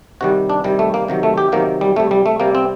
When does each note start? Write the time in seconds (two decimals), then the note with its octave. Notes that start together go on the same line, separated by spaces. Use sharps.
0.21 C3 D#3 G3 F#4
0.50 D4
0.64 C3 D#3 G3
0.79 A3
0.94 A#3
1.08 C3 D#3 F#3
1.23 A3
1.38 G4
1.52 C3 D#3 F#3 A#3
1.81 G3
1.96 C3 G3 A3
2.11 G3
2.26 A3
2.40 C3 G3 A#3
2.55 C4